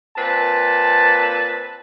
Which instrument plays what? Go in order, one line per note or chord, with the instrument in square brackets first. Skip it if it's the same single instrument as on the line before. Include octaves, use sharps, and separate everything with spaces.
[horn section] A#2 C4 B4 A5